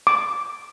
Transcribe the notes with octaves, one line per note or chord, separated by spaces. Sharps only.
D6